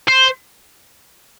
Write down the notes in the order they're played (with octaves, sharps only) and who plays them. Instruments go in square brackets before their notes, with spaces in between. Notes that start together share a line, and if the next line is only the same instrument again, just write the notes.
[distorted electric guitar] C5